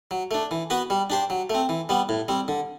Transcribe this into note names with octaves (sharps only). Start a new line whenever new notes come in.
F#3
A3 D4
E3
B3 F#4 B4
G3
D4 G4 C5
F#3
A3 C4
E3
G3 B3
A2
G3 C4
D3